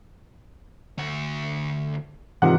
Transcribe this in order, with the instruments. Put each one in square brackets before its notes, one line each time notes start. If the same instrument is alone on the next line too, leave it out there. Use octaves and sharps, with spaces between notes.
[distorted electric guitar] D2 F#4
[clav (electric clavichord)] G#2 C3 D#3 [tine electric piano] E3 F4 [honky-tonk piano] F#5